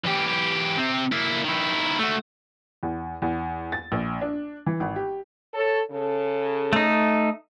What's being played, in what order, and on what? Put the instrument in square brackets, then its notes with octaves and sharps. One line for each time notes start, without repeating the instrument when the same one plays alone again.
[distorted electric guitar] E3 G4
C3 C4
A#3 E4
D#3 E4
A3 F#4
[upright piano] E2
E2
A6
A#1
D4
E3
G#1
G4
[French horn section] A4 C#5
C#3 A4
[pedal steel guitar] A3 D#4